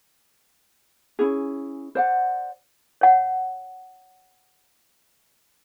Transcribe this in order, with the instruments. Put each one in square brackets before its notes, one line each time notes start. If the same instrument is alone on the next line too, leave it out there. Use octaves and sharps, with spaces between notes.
[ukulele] C#4 E4 G#4
C5 D5 F#5
[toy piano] C#5 F#5